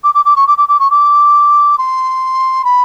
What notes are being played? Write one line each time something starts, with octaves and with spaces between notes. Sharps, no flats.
D6
D6
D6
C#6
D6
D6
D6
C#6
D6
C6
B5